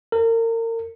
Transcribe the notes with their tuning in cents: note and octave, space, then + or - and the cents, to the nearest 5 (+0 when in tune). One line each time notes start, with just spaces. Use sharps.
A#4 -35